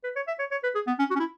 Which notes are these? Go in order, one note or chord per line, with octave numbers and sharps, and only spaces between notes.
B4
C#5
E5
C#5
C#5
B4
G#4
B3
C#4
F#4
C#4
E4